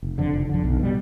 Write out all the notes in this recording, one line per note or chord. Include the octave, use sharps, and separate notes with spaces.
F1
F2 D3
F1
F2 D3
B1
B2 G3